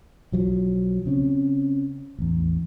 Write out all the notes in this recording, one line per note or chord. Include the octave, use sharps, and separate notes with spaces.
B1 F3 F#3
C#3 C4 C#4
A1 E2